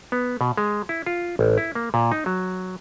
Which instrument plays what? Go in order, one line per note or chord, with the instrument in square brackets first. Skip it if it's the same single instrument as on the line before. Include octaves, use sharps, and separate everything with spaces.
[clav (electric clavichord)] B3
B2
G#3
E4
F4
A1
E4
A#3
A#2
D#4
F#3